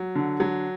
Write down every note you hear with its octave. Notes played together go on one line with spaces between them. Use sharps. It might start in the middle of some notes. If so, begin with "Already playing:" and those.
Already playing: F#3
D3
F#3